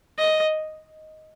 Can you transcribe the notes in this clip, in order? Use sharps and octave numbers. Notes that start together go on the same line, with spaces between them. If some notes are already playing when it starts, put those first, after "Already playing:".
D#5